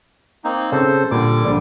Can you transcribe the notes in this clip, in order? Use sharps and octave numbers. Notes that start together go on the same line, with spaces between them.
A#3 C4 D#4
C#3 C4 A4 C5
A#2 D3 G3 D6
A#1 D4